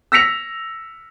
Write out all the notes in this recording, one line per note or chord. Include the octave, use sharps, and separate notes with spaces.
E6 A#6 B6 C#7 F7